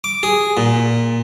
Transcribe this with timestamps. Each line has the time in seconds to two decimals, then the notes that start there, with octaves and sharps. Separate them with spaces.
0.04 D6
0.23 G#4
0.57 A#2